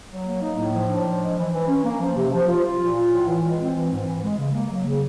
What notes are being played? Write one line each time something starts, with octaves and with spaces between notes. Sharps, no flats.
F#3
A#3
D#4
A2
F3
D4
F3
G#3
E3
E3
C#4
A#3
F3
C3
F3
F4
F4
A#2
F4
A2
E3
G#3
C4
E3
G#2
E3
G#3
C#3
A#3
F#3
C#3